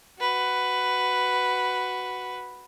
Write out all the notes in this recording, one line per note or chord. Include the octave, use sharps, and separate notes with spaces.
F#4 B4